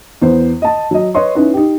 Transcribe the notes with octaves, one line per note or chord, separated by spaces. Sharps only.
E2 B3 C5
D#5 A5
F#3 D#5
B4 C#5 D#5 C6 C#6
C#4 D#4 E4 B4
D#4 G4